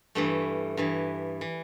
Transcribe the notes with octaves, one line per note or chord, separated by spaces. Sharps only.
G2 E3 A3
G2 E3
E3